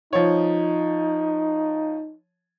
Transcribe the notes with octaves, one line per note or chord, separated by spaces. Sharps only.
F3 D#4 C#5